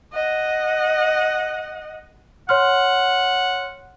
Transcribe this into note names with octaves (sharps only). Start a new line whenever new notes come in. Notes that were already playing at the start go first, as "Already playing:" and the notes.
D#5 F#5
C#5 F#5 C6 F6